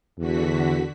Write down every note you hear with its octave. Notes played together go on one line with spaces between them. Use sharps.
E2 D3 F#4 B6